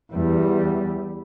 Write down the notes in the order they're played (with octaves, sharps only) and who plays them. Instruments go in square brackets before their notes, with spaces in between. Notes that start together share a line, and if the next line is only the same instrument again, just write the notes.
[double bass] E2 G3